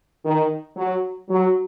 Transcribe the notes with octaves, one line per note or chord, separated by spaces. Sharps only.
D#3
F#3
F#3